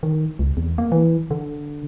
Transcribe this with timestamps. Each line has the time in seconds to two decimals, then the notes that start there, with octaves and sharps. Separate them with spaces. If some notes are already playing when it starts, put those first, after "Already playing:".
0.03 D#3
0.39 C#2
0.57 E2
0.78 A#3
0.92 E3
1.31 D3